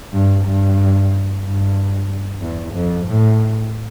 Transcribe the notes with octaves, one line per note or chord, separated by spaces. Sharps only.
G2
G2
G2
E2
F2
A2